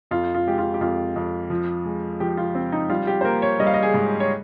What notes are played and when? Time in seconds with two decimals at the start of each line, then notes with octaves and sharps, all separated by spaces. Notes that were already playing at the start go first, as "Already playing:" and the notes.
0.11 F2 F4
0.34 F4
0.47 G#3 G4
0.58 F4
0.74 G4
0.81 F2 F4
1.16 F2
1.50 F3
1.85 G#3
2.20 F3 G4
2.37 F4
2.55 C4
2.72 D#4
2.89 G3 F4
3.07 G4
3.21 C5
3.24 A#3 A#4
3.42 C#5
3.60 G3 D#5
3.67 F5
3.74 D#5
3.83 G#4
3.94 G#2
4.20 C#5